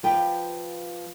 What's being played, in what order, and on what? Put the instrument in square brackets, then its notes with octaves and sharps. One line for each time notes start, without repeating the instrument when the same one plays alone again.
[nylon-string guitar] F3 G4 B4 G5